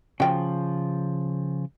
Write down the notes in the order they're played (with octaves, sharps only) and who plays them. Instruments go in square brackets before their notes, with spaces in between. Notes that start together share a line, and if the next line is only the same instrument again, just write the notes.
[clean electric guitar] C#3 F3 [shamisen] F#4 G5